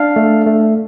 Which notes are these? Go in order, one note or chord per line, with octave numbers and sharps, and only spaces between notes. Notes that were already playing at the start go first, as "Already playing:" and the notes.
Already playing: D4 F5
A3
A3